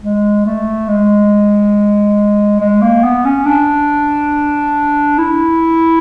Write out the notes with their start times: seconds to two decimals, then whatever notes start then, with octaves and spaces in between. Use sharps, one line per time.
0.02 G#3
0.45 A3
0.88 G#3
2.60 G#3
2.82 A#3
3.03 B3
3.25 C#4
3.46 D4
5.18 E4